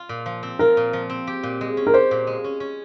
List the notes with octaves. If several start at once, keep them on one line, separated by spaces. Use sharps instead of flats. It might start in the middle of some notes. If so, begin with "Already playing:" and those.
Already playing: F4
A#2
F3
C4
F4 A#4
A#2
F3
C4
G4
A#2
G#3
C#4
A#4
G4 C5
A#2
G#3
C#4
C#4